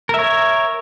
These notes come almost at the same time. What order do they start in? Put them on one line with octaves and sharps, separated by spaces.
A#4 E5 C#5